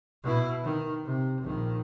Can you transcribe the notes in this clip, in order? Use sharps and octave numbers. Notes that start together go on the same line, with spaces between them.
B2 E4
D#3
C3
A#1 D#3